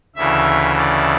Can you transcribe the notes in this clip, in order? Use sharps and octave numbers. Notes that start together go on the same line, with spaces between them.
D2 C#3 E3 E5
D5